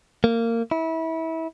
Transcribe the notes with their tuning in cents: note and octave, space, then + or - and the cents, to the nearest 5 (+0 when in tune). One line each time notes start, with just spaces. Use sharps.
A#3 -20
E4 -25